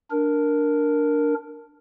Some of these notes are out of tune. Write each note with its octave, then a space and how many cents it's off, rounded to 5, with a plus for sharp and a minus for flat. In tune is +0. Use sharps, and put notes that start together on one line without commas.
D4 +0 A#4 +0